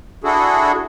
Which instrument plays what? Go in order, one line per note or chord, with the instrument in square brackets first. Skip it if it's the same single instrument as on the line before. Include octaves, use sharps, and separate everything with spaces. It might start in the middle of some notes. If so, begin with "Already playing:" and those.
[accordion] D4 E4 F#4 G#4 A4